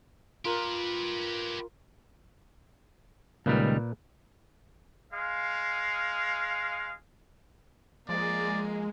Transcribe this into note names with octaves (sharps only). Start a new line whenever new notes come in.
F4 G4 A#4 B4
C#2 A#2 D#3 G3 A#3 B4
G#3 F5
F3 G#3 A#3 G#4 D5